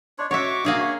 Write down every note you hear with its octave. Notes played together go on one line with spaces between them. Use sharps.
D4 C#5 D#5 C6
C#4 F#4 C#5 D#5 E5 C#6 D6
A#3 D4 F#4 G#4 E5
C#5 C#6